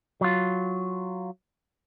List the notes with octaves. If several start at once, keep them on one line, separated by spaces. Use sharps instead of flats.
F#3 F4